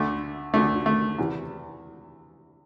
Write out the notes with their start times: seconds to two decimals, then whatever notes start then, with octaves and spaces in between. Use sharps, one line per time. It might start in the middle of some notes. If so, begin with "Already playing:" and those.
Already playing: D2 D3 A3
0.54 D2 D3 A3
0.86 A3
1.19 E2 C3 E3